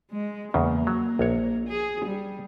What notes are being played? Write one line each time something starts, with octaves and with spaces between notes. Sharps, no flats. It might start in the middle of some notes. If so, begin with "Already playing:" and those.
G#3
E2 C#3 A#3
F#3
A#1 C#5
G#4
G3